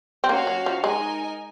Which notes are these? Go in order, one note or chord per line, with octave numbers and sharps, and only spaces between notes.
C4
A#3 C#4 F#4 C#5 F5
F#3
F3
G#3 D#4 A#4 D#5 G#5